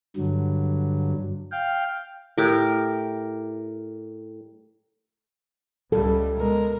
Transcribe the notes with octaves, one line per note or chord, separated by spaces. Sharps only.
G2 D3 F#3
F5 G5
A2 G4 A#4
C#2 C#3 G3 A4
B2 G#3 A#4